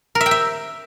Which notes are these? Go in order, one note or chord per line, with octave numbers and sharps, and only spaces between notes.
A#4
E5
G5
E5